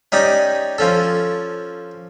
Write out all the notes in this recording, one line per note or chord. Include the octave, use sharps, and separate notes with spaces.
C#4 D#4 G4 D5 D6
F3 C#4 A4